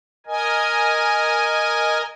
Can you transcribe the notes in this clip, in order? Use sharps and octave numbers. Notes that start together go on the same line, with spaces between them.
A#4 D#5 G#5